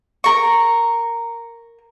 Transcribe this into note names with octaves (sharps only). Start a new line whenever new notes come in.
A#4 C#6